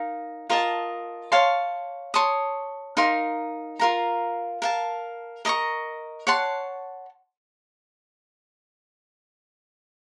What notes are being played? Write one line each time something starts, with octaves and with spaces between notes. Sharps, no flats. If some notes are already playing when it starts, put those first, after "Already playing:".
Already playing: D#4 A#4 F5
F4 A#4 D#5 A5
C#5 F5 A5 C6
C#5 A5 C6 D#6
D#4 A#4 F5 C6
F4 A#4 F5 A#5
A#4 F5 A5
A#4 D#5 A#5 C#6
C#5 F#5 A5 C6